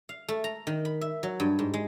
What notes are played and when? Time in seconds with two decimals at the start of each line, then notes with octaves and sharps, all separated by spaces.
0.09 F5
0.28 A3
0.44 A#5
0.67 D#3
0.85 B5
1.01 E5
1.23 F#3
1.40 G2
1.59 G#2
1.74 G#3